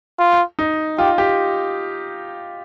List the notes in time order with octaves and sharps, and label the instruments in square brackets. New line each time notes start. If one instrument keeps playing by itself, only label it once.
[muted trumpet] F4
[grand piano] D#4
[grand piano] F4 [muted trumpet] G4
[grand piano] G4